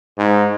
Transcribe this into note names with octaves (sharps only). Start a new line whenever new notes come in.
G#2